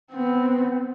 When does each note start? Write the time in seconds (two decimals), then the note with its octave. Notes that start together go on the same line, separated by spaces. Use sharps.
0.11 B3 C4